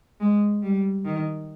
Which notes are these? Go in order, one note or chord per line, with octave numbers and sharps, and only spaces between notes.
G#3
G3
D#3